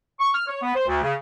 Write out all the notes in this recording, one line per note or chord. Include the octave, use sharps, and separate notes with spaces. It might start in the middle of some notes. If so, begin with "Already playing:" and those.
C#6
F6
C#5
B3
C5
D2
C#3